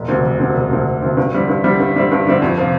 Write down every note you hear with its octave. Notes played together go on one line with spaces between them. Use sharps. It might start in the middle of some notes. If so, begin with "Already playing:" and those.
Already playing: E1
D2 C3
E1
D2 C3
E1
D2 C3
E1
D2 C3
G2
D3 G3 C4 E4
G2
D3 G3 C4 E4
G2
D3 G3 C4 E4
G2
D3 G3 C4 E4
F2
C3 F3